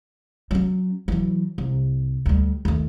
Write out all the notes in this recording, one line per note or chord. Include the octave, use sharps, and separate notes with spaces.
F#3 C#4
E3 F#3
C2
D2 G3
D#2 A3